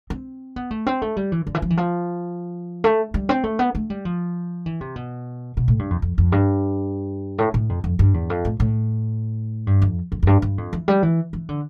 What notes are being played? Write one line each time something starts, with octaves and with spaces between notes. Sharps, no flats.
C4
B3
A3
C4
A3
G3
E3
D3
E3
F3
E3
F3
A3
G3
C4
A3
B3
A3
G3
F3
E3
C3
B2
B2
A2
G2
F2
F2
F2
G2
A2
A2
F2
F2
G2
E2
F2
A2
A2
G2
F2
F2
F2
G2
G2
F2
E3
G3
E3
E3
D3